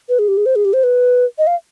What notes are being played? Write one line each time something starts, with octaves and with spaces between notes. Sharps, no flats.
B4
G#4
G4
G#4
C5
G#4
G4
C5
B4
D#5
F5